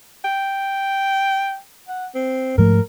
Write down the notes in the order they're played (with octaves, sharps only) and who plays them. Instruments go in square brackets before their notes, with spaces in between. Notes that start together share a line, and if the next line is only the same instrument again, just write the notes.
[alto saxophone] G5
F#5
C4
[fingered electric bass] G#2 F3 A3 [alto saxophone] A#4